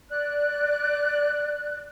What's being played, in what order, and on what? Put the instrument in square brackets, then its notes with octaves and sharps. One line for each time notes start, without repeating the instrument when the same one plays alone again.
[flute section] D5 F#6